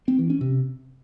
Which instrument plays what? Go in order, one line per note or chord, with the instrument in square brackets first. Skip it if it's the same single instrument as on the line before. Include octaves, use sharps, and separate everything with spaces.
[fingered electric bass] C4
E3
C#4
C3